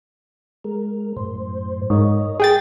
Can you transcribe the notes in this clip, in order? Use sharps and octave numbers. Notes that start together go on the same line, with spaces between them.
G#3 A#4
F#2 A2 C5
G#2 A#4 C#5 D#5
G#4 G5 A6